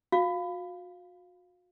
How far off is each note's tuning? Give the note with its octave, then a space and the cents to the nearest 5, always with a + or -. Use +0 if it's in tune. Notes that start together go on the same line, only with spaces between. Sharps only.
F#4 -40 F5 +0